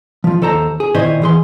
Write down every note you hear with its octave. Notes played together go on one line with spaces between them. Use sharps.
F3 F4
D#2 A4 C5 A5 A#5
G#4
A#2 D#3 E4 C5 C#5 D#5
E3 G#4 C6